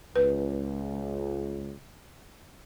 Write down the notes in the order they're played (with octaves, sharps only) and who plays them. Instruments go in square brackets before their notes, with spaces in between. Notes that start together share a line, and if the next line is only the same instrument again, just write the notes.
[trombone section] C#2 [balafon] B4